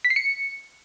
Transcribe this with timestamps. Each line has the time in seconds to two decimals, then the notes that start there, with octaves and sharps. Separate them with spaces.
0.05 B6
0.10 C7
0.16 C#7